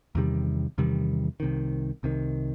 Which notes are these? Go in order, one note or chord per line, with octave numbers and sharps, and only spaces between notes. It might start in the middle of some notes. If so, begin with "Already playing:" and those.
E2 C3 D#3 G3
E2 C3 D#3 G3
C2 C3 D#3
C2 C3 D#3